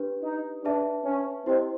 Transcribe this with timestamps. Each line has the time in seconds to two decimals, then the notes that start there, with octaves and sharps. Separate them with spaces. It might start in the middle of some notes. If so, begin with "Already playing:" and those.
Already playing: D4 G4 B4
0.23 D#4
0.64 D4 G#4 B4 E5 A5
1.05 C#4
1.46 C4 E4 G4 C5 D#5